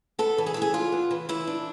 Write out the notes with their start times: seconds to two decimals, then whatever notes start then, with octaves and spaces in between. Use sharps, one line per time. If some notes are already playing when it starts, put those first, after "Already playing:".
0.19 B3 A4
0.38 E3
0.46 G#4
0.54 E3 A4
0.62 G#4
0.74 D4 F4
0.92 B3
1.11 E3
1.29 E3 E4
1.47 D4